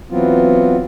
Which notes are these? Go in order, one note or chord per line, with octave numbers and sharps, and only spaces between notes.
E3 F#3 B3 C4 F4